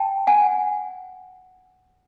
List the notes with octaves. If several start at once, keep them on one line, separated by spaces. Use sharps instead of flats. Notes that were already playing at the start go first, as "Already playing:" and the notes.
Already playing: G5 A5
F#5 G#5